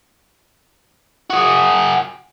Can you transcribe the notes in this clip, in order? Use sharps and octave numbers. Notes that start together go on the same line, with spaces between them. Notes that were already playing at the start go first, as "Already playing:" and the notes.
F#4 G#4